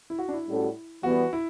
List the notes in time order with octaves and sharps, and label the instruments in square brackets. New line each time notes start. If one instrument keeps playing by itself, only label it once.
[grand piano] E4
F#4
D4
E4
[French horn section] A2 G3 C#4 F#4 A4
[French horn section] E3 G3 B3 [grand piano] F#4
[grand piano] E4